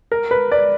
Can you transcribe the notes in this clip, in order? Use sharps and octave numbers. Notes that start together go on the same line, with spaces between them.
A#4
B4
D5